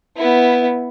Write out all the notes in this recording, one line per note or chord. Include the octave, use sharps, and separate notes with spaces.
B3 E4